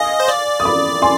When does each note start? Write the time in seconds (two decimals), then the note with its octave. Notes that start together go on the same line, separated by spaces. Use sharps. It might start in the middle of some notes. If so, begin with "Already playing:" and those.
Already playing: D#5 F5 G#5
0.20 C5
0.28 D5
0.60 D#6
0.65 B5 D6
1.02 G#5 C6